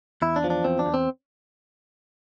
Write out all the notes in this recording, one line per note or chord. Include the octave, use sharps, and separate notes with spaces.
E2 E4
D4
F3
D4
E2 C4
D4
E2
C4